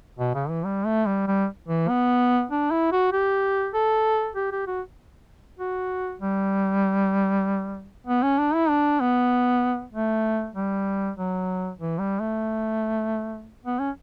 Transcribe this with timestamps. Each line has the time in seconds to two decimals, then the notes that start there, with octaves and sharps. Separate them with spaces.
0.19 B2
0.35 C#3
0.49 E3
0.65 G3
0.86 A3
1.06 G3
1.27 G3
1.68 E3
1.89 B3
2.51 D4
2.71 E4
2.92 F#4
3.12 G4
3.74 A4
4.36 G4
4.52 G4
4.67 F#4
5.59 F#4
6.21 G3
8.07 B3
8.23 C#4
8.39 D4
8.54 E4
8.69 D4
9.00 B3
9.93 A3
10.55 G3
11.16 F#3
11.79 E3
11.99 G3
12.20 A3
13.65 B3
13.79 C#4